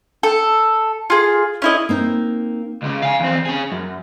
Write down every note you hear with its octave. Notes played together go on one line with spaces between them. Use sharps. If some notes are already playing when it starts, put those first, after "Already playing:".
A4
F4 G#4
C#4 E4 D#5
A#3 C4 D#4
C#2 C#3
F5 G#5
E2 C4
C#4 G#4
F#2